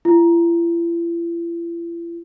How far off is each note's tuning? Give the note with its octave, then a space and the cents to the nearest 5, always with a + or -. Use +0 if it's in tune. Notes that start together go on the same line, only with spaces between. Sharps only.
E4 +45